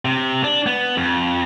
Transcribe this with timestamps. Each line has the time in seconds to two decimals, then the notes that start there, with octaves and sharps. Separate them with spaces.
0.05 C3
0.44 D4
0.66 B3
0.97 F2